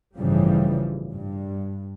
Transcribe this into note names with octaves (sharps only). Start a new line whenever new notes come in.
A1 G2 C#3 E3 F3 G3
G2